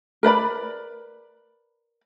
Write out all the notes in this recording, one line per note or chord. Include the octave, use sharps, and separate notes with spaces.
A#4 B4 D5 B5